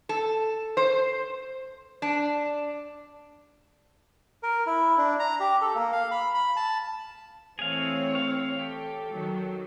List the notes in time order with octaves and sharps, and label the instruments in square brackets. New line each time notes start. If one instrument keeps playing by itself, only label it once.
[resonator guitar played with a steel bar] A4
C5
D4
[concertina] A#4
E4
D4
A#5
G4
A4
A#3
F5
B5
B5
A5
[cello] E3 A3 [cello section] C4 C#5 [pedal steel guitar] G#4 F5
[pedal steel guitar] F5
[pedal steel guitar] G4 [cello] A4
[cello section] D#3 F#3